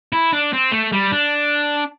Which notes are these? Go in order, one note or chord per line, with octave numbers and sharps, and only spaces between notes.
E4
D4
C4
A3
G3
D4